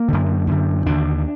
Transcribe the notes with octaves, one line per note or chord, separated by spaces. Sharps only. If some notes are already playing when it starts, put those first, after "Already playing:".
Already playing: A#3
F#2 D3
F#2 D3
D#2 D3 D4